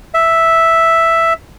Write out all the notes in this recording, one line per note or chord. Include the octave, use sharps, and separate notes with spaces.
E5